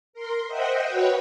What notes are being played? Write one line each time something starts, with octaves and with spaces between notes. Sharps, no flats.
A#4 C6
C5 D#5 E5 F#5 G5
F#4 B4 C#5 G5